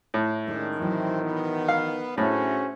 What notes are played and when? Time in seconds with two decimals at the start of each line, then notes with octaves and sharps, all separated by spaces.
0.14 A2
0.47 D#3 G#3 C#4 D4 G#4
0.79 E3 F#3 C4 E4
1.21 B3
1.69 F5
2.18 A2 A3 C#4 D4 F#4 G#4 C5